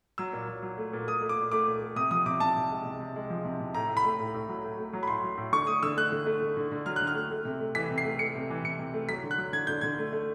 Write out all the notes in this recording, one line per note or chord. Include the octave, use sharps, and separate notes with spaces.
F#3 E6
A#2
F#3
F#3
A3
A#2
A3 D#6
A3
D6
A#2
A3 D6
A#2
A3
C3 D#6
F3 D#6
C3 D6
C3 A5
C3
G#3
C3
C3
G#3
F3
C3
C3
A2 A#5
A2
B5
A3
A2
A2
F#3
A2
A3
F#3
B5
A2 C6
F#3
A2
D3 C#6
A3 D#6
D3 E6
A3 F#6
D3
A3
D3
D3
D3
F#3 F6
F#6
D3
F6
A3
A3
C3
A3
E3 B6
C3
C7
A3
A3 C#7
C3
E3
C3 C#7
C3
A3
F#3 B6
D3
F#6
F#3
D3 G#6
D3 G6
D3 G#6
A3
A3